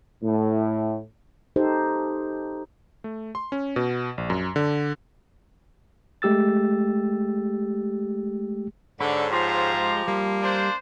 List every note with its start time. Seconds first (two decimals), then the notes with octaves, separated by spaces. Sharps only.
0.23 A2
1.56 D#4 G4 A4 C5
3.04 A3
3.35 C6
3.52 C#4
3.76 B2
4.18 A#1
4.30 F#2
4.56 D3
6.22 G#3 A3 G4 E6 A6
9.00 G#2 D3 C#5 B5
9.32 F3 F4 G4 C5 A#5
9.74 G#3
10.08 G3 A#3
10.42 D4 C5